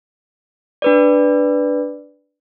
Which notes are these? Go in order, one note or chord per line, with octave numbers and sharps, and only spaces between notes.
D4 B4 D5